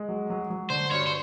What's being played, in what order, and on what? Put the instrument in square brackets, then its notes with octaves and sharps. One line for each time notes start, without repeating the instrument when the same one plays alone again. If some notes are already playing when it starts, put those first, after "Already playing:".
Already playing: [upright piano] G#3
F#3
F#3
F#3
[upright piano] D3 [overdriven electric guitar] C5
[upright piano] G2 [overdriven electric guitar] C#5
[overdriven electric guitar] C5